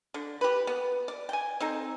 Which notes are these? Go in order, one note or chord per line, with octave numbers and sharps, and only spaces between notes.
D3
G4 B4
B3
D5
G5 G#5
C4 D#4 A4